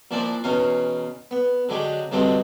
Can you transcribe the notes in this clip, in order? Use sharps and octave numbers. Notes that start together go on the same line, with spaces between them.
A#2 F3 D4 E4 D5
E2 B2 C#4 D#4 F5
B3
D3 F#3 G#3 G4
G2 D3 F#3 G#3 A3 C4